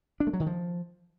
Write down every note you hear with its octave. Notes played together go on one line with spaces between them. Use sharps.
D4
A3
F#3
D#3
F3